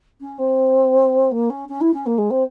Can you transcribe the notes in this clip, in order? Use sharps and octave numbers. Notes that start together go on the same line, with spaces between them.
C#4
C4
A#3
C#4
C#4
E4
C#4
A#3
G#3
C4